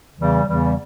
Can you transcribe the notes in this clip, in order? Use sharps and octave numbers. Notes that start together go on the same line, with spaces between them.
E2 C#3 E3 G3
E2 C#3 E3 G3